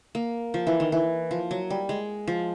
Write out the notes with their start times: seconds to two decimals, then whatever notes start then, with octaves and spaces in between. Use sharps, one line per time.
0.15 A#3
0.54 F3
0.67 E3
0.80 D#3
0.92 E3
1.31 F3
1.51 F#3
1.70 G3
1.89 G#3
2.27 F3